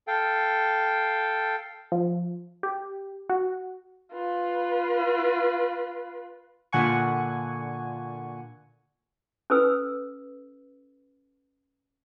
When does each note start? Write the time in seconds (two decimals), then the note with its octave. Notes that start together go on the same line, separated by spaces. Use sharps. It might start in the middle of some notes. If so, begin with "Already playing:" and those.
0.07 A4 F5 G5
1.92 F3
2.63 G4
3.29 F#4
4.13 F4 B4
6.72 A#2 D3 F#5 G#5 C#6
9.50 C#4 A4 B4 E6